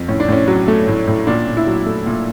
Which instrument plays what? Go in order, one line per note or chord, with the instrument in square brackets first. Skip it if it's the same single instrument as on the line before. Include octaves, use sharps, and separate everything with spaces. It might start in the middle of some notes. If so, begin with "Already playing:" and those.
Already playing: [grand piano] F2
A2 C#4
D4
A2 C#4
F#3
A3
A2
A2
A#2 D4
A#2
E4
F#3
A3
A#2